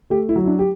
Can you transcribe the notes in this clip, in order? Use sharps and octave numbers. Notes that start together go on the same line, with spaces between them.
A3 G4
E4
F#3
E4
D4
G4